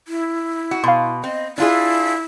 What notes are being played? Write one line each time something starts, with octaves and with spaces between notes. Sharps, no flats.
E4
F#4
B2 F5 C6
C4 D#5
D4 E4 F4 G#4